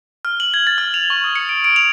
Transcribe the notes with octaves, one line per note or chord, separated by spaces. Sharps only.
F6
F#7
G#6
A6
F6
F7
C#6
D#6
C#7
D7
D7
F7